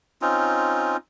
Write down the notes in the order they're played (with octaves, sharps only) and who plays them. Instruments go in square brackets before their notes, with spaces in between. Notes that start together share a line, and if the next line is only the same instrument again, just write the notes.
[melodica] C4 C#4 D#4 F4